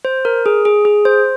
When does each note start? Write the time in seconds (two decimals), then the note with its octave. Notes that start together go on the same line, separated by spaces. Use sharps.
0.05 C5
0.25 A#4
0.46 G#4
0.65 G#4
0.85 G#4
1.05 C5